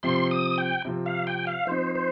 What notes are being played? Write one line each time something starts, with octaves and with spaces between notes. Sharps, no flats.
C3 F3 C4 C6
D#6
G5
C3 F3 C4
F5
G5
F5
F3 C4 D#4 C5
C5